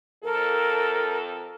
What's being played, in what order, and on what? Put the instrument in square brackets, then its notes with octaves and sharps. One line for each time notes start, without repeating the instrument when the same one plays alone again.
[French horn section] F2 A4 [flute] A#4